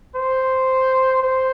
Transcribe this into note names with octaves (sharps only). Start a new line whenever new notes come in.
C5
C5